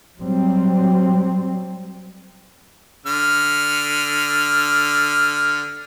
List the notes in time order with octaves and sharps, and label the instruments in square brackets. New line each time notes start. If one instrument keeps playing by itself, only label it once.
[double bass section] F#3 G3 C4
[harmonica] D3 F6